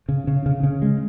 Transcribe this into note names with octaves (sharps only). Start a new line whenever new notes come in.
C#3
C#3
C#3
C#3
G#3